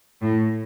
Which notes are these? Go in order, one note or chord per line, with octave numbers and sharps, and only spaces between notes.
A2